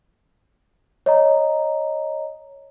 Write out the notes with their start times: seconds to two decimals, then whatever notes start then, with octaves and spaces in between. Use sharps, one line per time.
1.06 C#5 D#5 A#5